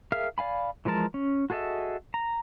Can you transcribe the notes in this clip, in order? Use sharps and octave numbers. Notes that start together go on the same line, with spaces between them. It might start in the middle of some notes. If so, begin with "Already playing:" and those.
G#4 A#4 E5 F5 F6
D5 F5 G#5 B5
E3 F3 G#3 A#4 A5
C#4
F#4 G#4 A4 D#5 E5
A#5